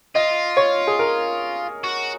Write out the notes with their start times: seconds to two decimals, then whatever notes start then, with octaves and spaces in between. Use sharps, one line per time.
0.15 F4 D#5
0.57 C#5
0.87 G#4
0.99 A#4
1.84 F#4